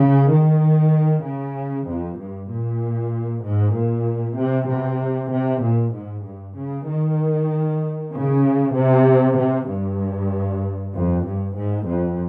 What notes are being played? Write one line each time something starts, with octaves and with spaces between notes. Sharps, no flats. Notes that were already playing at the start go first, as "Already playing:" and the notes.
Already playing: C#3
D#3
C#3
F2
G2
A#2
G#2
A#2
C3
C3
C3
A#2
G#2
G2
C#3
D#3
C#3
C3
C3
G2
F2
G2
G#2
F2